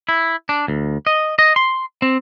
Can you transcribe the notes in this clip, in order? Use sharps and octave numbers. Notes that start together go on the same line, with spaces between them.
E4
D4
D2
D#5
D#5
C6
C4